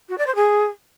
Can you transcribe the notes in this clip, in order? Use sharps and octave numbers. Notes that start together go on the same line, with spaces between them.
F#4
D5
C5
G#4